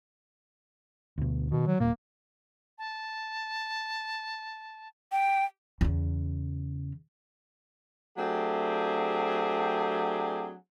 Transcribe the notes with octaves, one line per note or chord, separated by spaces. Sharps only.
D2 B2
B2 D#3
F#3
D#1 A#2 A#3
A5
G5
E2 C#3
F#3 A3 C4 D4 G4 G#4